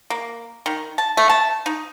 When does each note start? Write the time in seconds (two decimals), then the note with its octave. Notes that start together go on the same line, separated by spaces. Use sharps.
0.10 A#3
0.66 D#3
0.98 A5
1.17 A3
1.29 A5
1.66 D#4